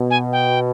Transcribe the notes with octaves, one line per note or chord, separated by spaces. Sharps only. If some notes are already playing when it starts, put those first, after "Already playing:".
Already playing: B2
G#5
G5